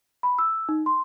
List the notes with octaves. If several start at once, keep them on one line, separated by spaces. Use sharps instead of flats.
B5
E6
D#4
C6